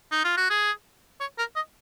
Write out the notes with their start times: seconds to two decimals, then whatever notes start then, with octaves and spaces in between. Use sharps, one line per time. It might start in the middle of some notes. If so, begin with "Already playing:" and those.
0.12 D#4
0.25 F4
0.37 F#4
0.50 G#4
1.20 C#5
1.39 A#4
1.56 D#5